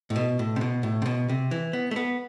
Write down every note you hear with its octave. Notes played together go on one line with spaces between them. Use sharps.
A2
B2
A2
C3
B2
A2
C3
B2
C3
E3
B3
A3
B3